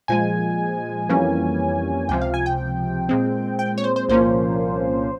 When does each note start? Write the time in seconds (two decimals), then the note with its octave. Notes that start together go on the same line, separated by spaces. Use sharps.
0.08 A#2 F3 G#3 G#5
1.09 F2 E3 G3 A#3 C#4
2.09 C#2 C3 F3 G5
2.21 F5
2.34 G#5
2.46 G5
3.09 A#2 G#3 C4
3.59 G5
3.78 C#5
3.84 C5
3.96 C5
4.09 C2 A#2 F3 A#3 C#4 C5